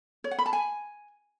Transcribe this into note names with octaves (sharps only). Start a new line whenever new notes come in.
C#5
F#5
B5
A5
G#5